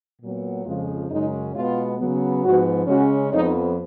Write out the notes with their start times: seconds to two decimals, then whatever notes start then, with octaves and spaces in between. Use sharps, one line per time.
0.22 A#2 F#3 B3
0.65 F2 C#3 F3 G#3 F4
1.09 F#2 C#3 G#3 C#4 D#4
1.55 B2 G#3 B3 F4
1.99 C#3 F#3 B3
2.43 G#2 F3 B3 F#4
2.87 C#3 G#3 C#4 F#4
3.32 F2 F3 B3 D#4